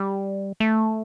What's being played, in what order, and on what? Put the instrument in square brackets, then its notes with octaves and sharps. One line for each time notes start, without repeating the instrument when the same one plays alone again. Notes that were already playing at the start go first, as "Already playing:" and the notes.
Already playing: [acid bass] G3
A3